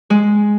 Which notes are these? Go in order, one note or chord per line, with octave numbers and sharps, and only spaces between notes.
G#3